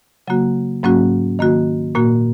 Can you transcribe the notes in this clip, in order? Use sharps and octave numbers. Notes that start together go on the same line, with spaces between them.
C#3 F#3 A#3 F#4
G#2 F#3 A#3 C#4 F#4
D#3 A#3 F#4
A#2 A#3 F#4